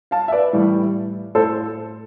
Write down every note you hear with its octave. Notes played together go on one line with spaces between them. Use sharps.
F5 A5
E5
B4 D5
A2 E3 G3
A2 A4 C5